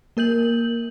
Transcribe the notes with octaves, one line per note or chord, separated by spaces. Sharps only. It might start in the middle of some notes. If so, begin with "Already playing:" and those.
A#3 A#4 G6 F#7